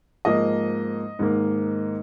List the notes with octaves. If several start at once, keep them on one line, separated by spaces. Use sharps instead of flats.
G#2 F3 A#3 D#5
G#2 D#3 A#3